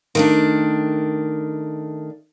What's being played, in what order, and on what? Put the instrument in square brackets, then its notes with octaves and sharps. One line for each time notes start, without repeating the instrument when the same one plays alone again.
[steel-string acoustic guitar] D#3 A3 D4